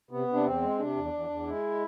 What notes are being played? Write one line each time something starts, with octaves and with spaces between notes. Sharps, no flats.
C3 B3
C3
D4
E2 C4
G#3
C3 D4
E2
E2
E2
G#3 E4